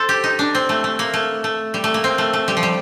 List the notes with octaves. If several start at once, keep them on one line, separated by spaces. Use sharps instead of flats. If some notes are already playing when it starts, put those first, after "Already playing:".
Already playing: A4 C5
G4
D#4
D4
C4
A3
A3
A#3
A3
A3
G3
A3
A#3
C4
A3
A3
G3
F3
G3